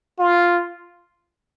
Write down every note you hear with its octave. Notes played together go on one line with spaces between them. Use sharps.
F4